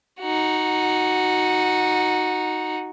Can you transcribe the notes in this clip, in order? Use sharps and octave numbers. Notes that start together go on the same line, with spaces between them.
D#4 F#4